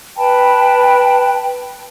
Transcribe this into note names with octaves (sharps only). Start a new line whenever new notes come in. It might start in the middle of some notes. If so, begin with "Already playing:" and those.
B4 G5 A5 B5